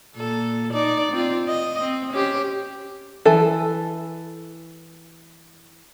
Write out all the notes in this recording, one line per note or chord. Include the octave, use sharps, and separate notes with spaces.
A#2 A4
D#4 D5
C4 F4
D#5
C4
C#4 G4 C5
E3 A4